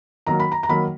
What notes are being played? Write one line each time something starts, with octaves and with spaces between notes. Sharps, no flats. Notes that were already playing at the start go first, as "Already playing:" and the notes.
D#3 F#3 A#3 A#5
B5
A#5
A#5
D#3 F#3 A#3 B5